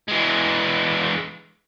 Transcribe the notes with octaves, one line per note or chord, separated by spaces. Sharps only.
E3 G#3